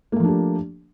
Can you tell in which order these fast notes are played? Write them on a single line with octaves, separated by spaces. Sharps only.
A#3 A3 F3 D4 G4